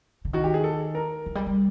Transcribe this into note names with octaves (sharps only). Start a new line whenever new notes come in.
D3
D#3 F#4
G4
G#4
A4
A#4
E3
G3
G3